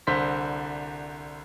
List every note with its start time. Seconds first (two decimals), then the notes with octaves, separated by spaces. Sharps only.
0.07 C2 D3 C5 B6